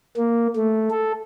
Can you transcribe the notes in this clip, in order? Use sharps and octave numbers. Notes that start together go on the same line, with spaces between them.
A#3
A3
A4